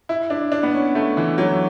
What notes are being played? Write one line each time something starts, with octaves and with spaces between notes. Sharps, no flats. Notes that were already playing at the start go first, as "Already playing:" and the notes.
E4
D4
D4
B3
C#4
A3
E3
F#3